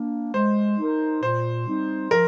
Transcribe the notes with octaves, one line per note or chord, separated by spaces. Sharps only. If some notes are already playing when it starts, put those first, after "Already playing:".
Already playing: A#3 D4
G#3 C5
D#4 A#4
A#2 C5
G3 C4 D#4
F3 A#4